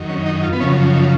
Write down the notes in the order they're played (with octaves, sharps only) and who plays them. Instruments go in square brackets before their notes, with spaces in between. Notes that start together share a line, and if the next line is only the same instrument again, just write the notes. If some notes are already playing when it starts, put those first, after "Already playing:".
Already playing: [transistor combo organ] F#2 D#3
C#4
D#4
F4
B3
F#2 C#3 F3 C#4
D#4